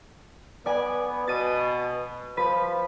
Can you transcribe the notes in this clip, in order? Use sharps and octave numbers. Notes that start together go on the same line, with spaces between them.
B3 D5 G#5
B2 A6 D#7
F3 B4